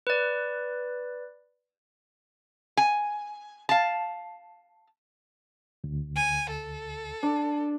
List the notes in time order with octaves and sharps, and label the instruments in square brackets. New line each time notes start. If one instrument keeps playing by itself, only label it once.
[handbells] B4 D5
[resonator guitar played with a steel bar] G#5
F5 A5
[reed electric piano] D2
[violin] G#5
A4
[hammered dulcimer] D4